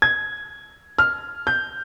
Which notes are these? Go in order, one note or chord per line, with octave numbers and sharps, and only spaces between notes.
G#6
F6
G6